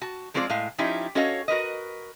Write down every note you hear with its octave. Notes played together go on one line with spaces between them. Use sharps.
F#4 A5
F3 G#3 C4 F4 C5 D5
A2 G#3 F5
F3 C#4 D#4 E4 G4
C#4 F#4 A4 C#5 D#5 F5
F#4 A#4 B4 D#5